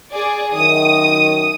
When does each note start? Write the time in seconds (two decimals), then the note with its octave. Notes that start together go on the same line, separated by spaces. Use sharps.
0.12 G#4 D5
0.54 F#2 D#3 D#6